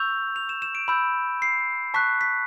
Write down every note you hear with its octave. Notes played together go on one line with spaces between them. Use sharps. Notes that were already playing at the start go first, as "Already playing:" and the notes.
Already playing: C#6 E6 G6 F7
F7
E7
E7
D7
B5 E6 G6
C7
A5 C#6 F#6 B6
B6